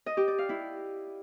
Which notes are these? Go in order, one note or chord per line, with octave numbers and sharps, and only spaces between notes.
D#5
G4
D5
F5
E4